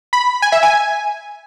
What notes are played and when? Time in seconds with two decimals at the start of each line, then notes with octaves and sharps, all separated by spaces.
0.13 B5
0.42 G#5
0.52 E5
0.63 G#5